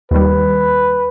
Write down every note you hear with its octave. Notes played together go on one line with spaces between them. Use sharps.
D#2 D#3 G3 B4